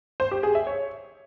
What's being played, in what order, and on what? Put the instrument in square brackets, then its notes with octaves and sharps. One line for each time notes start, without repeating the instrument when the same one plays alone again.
[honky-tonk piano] C5
G4
G#4
E5
C#5